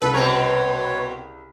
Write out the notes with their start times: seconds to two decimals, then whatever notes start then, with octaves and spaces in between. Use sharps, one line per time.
0.02 C2 C#3 A4 B4
0.14 B2 C4 A#4 C#5